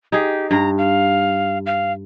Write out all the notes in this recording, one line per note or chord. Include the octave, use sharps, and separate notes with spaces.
D#4 G4 G#4
G2 A#5
F5
F5